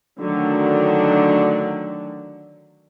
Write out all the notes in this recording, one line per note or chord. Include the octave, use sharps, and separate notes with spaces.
D3 D#3 F#3 A3 D4